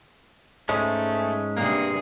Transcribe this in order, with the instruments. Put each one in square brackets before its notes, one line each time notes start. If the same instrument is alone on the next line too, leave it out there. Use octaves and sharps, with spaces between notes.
[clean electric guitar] G#2 G#3 C#4 [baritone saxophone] A3
[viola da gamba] G2 C3 G#4 [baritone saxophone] A#3